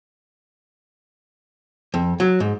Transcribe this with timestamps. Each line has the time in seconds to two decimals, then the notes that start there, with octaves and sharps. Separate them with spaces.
1.94 F2
2.20 F#3
2.40 G#2